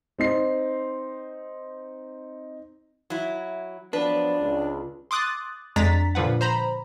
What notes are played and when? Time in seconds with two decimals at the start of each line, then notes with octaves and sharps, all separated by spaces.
0.18 C4 D#4 C7
3.10 F#3 E4
3.93 F3 F#3 B3 D4 B4 D5
4.40 C#2
5.11 C6 D6 D#6 F#6 A6
5.76 F2 G#3 D4 A#5 A6 B6
6.15 A#2 D3 F3 B4 F#5
6.41 C5 A#5 B5